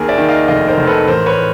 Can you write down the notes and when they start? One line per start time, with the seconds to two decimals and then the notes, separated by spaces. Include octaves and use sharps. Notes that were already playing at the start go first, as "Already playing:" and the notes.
Already playing: D#2 G#4 A#4
0.09 D5 E5
0.18 D#3
0.28 D#5 F5
0.48 F1 D#5 F5
0.68 A#4 C5
0.78 F1
0.87 A4 B4
1.08 A1 A#4 C5
1.26 B4 C#5